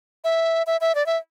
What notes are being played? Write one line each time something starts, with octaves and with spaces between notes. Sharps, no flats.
E5
E5
E5
D5
E5